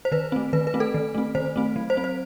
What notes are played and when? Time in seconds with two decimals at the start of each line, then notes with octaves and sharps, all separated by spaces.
0.05 C5
0.12 D#3 B4
0.32 A3 C4
0.53 D#3 B4
0.67 B4
0.74 A3 C4
0.80 A4
0.94 D#3
1.15 A3 C4
1.35 D#3 C5
1.56 A3 C4
1.76 F#3
1.90 C5
1.97 C4
2.04 C5